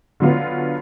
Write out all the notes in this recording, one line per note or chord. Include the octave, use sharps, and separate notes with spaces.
D3 F#3 B3 F4